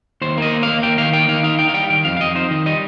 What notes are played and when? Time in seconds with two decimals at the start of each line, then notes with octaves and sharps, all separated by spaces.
0.22 D#2 C5
0.38 A#3 D#5
0.52 D#2
0.63 A#3 F5
0.82 D#2 G5
0.98 D#3 F5
1.13 A#3 G5
1.28 D#3 F5
1.43 D#4 F5
1.59 D#4 G5
1.69 F5
1.74 G3 G5
1.90 D#3 G5
2.05 F2 F5
2.17 F5
2.20 F2 D#5
2.35 D#4 C5
2.51 D#3 D#5
2.66 G3 D#5